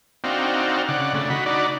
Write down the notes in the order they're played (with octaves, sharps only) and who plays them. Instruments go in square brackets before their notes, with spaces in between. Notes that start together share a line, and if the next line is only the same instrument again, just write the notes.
[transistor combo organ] C4 D4 D#4 F#4 F5 G5
C#3 D5 F#5
C#3 A3 D4
D#4 F#4 B5
D4 D#4 F#4 D5